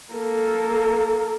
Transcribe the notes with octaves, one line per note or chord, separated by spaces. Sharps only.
A#3 A4